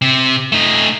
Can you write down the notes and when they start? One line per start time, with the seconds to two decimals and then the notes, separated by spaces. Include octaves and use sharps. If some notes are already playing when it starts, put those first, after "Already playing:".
0.02 C3
0.52 A3 D#4